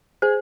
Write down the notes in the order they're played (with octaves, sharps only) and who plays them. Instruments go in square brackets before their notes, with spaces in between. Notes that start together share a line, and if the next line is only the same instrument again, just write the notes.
[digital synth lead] G#4 [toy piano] C5